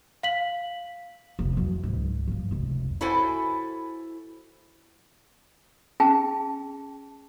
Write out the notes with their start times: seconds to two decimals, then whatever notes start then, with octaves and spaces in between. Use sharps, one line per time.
0.23 F5 B6 F#7
1.39 F1 C#2
1.57 E3 F#3
1.83 C#2 G#2
2.27 G2 F3
2.51 F1 C#2
3.01 E4 F#4 A4 B4 C5 G#5
6.00 C#4 G#4 G5 A5